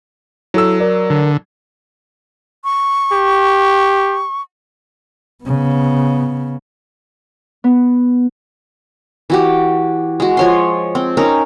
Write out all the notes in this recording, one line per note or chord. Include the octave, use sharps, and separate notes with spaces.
F#3 E4 A4 E6
A#4 D5
D3
C#6
G4
C#3 B3
B3
E3 F#4 G4
G#3 F#4
F3 C#5 C6
C4
C#4 D#4 A#4